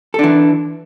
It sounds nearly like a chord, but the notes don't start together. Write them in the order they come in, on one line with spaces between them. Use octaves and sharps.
A4 D4 E3